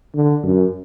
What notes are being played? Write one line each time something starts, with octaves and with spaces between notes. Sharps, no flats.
D3
F#2